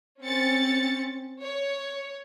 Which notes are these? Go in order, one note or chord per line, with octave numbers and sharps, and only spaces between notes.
C4 C#4 A6 C#7
C#5